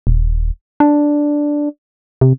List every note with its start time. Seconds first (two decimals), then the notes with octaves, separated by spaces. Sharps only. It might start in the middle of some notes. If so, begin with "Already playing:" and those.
0.07 D#1
0.80 D4
2.21 C3